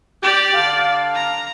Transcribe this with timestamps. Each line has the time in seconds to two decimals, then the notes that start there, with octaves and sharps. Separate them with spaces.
0.23 G4 D5
0.54 D3 F5
1.15 A#5